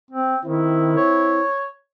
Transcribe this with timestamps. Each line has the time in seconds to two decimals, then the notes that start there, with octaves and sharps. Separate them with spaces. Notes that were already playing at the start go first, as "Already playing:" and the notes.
0.11 C4
0.45 D#3 C4 E4
0.96 C#5